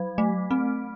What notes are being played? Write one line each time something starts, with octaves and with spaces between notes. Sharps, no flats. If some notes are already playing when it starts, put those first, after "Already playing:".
Already playing: F#3
A3
C4